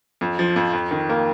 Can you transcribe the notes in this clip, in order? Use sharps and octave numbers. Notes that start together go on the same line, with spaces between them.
F2
F3
F2
F2
D#3
A#3